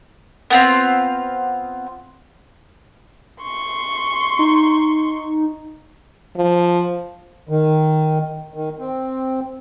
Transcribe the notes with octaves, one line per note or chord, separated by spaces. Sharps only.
B3 C4 F4
C6 C#6
D#4
F3
D#3
D#3
C4